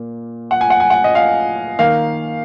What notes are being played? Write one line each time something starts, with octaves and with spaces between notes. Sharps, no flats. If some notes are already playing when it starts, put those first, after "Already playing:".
Already playing: A#2 A#3
F#5
G#5
F#5
G#5
F#5
D#5
F5
D#3 A#3 F5